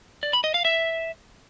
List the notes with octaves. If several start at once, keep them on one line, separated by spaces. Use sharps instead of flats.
D5
B5
D#5
F5
E5